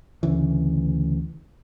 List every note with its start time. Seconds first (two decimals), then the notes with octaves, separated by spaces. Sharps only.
0.23 D2 C#3 E3